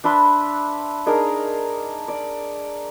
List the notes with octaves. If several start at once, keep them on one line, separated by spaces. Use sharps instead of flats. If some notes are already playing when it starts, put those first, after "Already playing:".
D4 B4 E5 C6
D4 D#4 G#4 A#4
D5